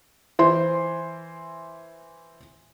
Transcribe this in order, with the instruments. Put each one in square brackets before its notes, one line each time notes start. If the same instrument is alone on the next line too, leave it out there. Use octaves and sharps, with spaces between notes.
[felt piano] E3 C5 C6